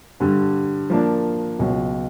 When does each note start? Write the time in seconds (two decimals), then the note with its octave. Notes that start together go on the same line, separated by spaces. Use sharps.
0.20 G2 D3 G3
0.90 F3 A#3 D4
1.59 C#2 B2 F#3